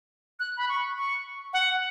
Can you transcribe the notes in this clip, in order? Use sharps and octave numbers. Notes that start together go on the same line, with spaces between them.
F#6
B5
C#6
C#6
F#5